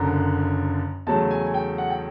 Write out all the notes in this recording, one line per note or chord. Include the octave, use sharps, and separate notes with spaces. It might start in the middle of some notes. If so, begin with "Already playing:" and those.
Already playing: F#1 F#2 D3 A#5
E2 C#3 F#3 A3 A5
G#5
G#5
G5
F#5
G5